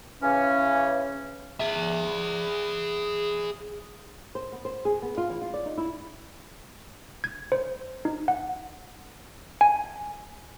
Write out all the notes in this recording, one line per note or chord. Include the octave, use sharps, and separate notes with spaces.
C#3 E3 C#4
G#4 E5
C5
B3
C5
G#4
B3
F4
E3
F4
D5
D#4
E4
G#6
C5
D#4
F#5
G#5